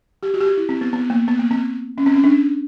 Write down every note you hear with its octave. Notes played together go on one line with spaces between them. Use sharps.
G4
F#4
G4
F#4
E4
C4
B3
B3
A#3
B3
A#3
C4
C#4
C4
C#4
D4